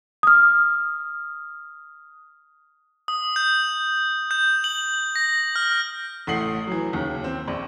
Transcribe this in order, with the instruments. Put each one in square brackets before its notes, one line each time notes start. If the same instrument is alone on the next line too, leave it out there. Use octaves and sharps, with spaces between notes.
[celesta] D#6 F6
[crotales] D#6
G6
G6
F#7
A#6
F6
[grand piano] A1 A3 F#5 D#6 C7 F#7
E3 F#3
D#2 C#3
C4
A#1